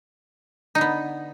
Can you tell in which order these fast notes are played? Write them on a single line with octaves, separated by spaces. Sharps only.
D#4 D3 B3